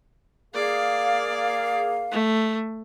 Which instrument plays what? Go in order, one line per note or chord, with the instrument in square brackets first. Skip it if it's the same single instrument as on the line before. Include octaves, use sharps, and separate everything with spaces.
[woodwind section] A#3 G#4 F5 [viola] D5
[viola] A3